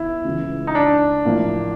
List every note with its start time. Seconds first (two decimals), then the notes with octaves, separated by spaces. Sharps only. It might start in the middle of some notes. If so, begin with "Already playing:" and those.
Already playing: D#3 B3 E4
0.25 C#2 C#3 E3
0.67 D#4
0.75 D4
1.25 A1 A2 F3 A#3